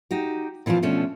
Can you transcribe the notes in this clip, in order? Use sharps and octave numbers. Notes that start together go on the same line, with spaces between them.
D#4 F#4 G4
A#2 E3 F3 C4 F4
B2 F3 A3 C#4 D4